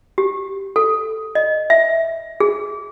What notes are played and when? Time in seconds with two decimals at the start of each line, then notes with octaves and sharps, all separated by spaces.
0.18 G4
0.76 A4
1.35 D#5
1.70 E5
2.40 G#4